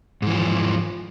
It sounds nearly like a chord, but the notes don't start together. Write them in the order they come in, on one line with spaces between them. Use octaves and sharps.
G#2 E3 F3